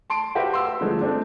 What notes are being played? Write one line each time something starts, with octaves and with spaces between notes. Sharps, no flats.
A5 C6 D7
F#4 G4 B4 C5 E5 F5
C6 E6
E6
D3 F3 G#3 A3
A3 C4 D4